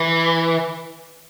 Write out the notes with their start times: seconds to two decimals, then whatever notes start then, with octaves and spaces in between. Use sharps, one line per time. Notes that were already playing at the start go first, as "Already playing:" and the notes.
Already playing: E3